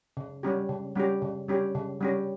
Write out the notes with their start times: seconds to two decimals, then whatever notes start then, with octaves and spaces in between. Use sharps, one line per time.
0.17 C#3
0.43 G3 C#4 G4
0.69 C#3
0.95 G3 C#4 G4
1.22 C#3
1.48 G3 C#4 G4
1.75 C#3
2.01 G3 C#4 G4